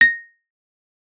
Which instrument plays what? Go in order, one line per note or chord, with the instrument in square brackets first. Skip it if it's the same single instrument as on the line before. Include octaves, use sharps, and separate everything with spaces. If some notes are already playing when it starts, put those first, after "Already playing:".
[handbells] A#6